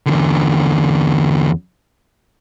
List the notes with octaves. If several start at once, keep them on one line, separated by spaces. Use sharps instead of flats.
E2 D3